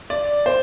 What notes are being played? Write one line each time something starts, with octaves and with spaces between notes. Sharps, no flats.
D5
C5